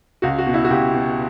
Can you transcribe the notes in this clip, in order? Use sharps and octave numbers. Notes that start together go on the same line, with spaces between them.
C#2 F#4
F#4
B2
E4
F#4
C#2 G4
B2